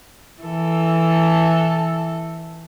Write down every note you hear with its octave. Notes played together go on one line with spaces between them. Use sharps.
E3 A4